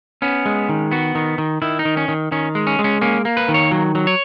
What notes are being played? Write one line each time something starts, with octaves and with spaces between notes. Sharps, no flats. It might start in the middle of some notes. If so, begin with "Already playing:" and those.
B3 C#4
G#3
D#3
B3 F#4
D#3
D#3
D#3 E4
D#4
D#3
C#4
D#3
D#3 C#4
G#3
C#4
G#3
C#4
A#3 C#4
A#3
B4
D#3
C#5
F#3
F#3
C#5